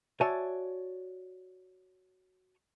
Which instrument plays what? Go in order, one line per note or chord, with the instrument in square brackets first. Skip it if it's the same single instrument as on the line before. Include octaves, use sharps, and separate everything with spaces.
[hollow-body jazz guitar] F#4 C#5 D5 E5 G#5 A5